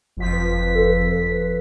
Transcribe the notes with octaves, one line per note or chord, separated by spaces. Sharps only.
F#1 F2 F3 B6
B4
A4
B4